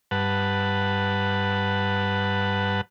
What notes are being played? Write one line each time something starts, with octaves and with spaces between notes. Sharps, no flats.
G2 B4 F#5 A5